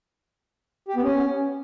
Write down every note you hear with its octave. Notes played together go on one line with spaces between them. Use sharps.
G4
B3
C#4